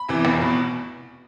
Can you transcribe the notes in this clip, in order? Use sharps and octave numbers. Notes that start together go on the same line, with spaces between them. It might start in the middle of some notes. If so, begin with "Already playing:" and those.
Already playing: B5
E2 C3 E3
F1
E2 B2